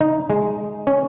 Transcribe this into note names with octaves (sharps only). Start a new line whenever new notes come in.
D#4
G#3
C#4